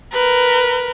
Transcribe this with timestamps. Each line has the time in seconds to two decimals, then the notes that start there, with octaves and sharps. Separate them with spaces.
0.12 A#4 B4